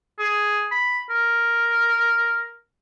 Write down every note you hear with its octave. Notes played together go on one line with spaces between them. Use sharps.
G#4
B5
A#4